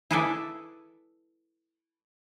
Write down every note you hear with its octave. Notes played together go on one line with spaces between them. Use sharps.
E4 G#4 A4 B4 D5 E5